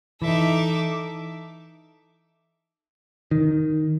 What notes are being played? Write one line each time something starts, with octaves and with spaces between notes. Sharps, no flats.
E3 D#4 A4 E5 D6
D#3